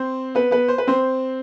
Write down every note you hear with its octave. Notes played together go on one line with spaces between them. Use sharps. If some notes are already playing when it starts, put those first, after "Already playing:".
Already playing: C4 C5
B3 B4
B3 B4
C5
B4
C4 C5